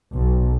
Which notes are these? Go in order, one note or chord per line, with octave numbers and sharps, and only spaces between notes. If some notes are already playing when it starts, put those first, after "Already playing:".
B1